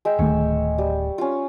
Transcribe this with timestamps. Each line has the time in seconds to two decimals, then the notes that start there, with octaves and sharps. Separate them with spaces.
0.05 G#3 E5 G5
0.19 D1 D#3 A3 C#5
0.78 G3
1.18 C#4 F4